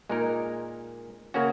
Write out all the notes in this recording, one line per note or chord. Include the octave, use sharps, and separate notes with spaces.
A#2 G#3 D#4 A#4
C#3 A#3 C#4 F#4